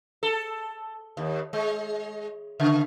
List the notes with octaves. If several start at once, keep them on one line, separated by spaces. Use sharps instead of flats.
A4
D#2
G#3
C#3